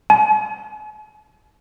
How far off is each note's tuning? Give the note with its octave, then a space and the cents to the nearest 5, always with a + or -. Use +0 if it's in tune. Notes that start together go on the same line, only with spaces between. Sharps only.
G#5 +45